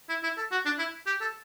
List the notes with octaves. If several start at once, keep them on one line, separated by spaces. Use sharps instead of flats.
E4
E4
A4
F#4
D4
E4
G4
A4